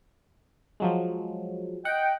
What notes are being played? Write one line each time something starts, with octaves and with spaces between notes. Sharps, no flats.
F3 F#3 G#3
D#5 F#5 G5